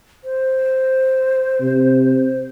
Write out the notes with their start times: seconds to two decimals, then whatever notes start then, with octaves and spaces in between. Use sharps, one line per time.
0.24 C5
1.61 C3